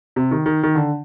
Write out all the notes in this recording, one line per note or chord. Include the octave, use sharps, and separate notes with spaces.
C3
D#3
D#3
D#3
D3